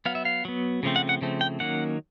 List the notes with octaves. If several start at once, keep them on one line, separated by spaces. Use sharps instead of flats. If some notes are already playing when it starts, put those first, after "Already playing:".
F#3 B3 F5
E5
F5
F#3 B3
C#3 F3 A3 C4
F#5
F#5
C#3 F3 A3 C4
G5
D#3 F#3 A#3 C#4 F#5